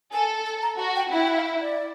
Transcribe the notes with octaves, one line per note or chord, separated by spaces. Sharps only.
A4 G#5
A5
A#5
F#4 A5
G5
E4 F#5
G5
F#5
F5
E5
D5